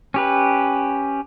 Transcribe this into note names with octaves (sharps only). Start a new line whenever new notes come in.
C#4 G4 B4